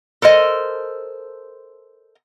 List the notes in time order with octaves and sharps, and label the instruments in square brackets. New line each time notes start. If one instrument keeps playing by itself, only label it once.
[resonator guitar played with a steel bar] A4 A#4 C5 D#5